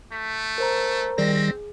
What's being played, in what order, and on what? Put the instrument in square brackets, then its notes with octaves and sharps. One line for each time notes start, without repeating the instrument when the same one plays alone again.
[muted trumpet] A3 [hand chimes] B6
[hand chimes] A#4 C5 A#5
[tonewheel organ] D#3 G3 A#6 [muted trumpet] C4 [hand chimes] G#4